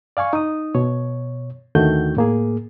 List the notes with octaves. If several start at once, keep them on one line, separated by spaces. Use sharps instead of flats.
D5 F5 G#5 C#6
D#4 D#6
B2 C#5
D#2 D3 D#3 A3 F#4 G6
A2 A#3 G#4